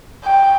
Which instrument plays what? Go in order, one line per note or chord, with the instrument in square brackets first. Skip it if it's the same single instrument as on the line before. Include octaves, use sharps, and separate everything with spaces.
[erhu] G5